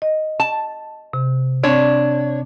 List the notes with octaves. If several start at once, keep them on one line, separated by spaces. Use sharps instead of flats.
D#5
A5
C3
C4 D4 C#5